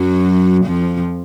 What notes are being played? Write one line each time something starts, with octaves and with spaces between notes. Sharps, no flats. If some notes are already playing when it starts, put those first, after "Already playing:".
Already playing: F#2 F#3
F2 F3